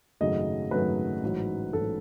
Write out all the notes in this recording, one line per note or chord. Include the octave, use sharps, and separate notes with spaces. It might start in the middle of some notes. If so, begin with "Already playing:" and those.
G#1 F#2 C#3 F#3 A3 D#5
G#1 F#2 C#3 F#3 A3 B4
A1 G#2 F#3
A1 G#2 F#3 A4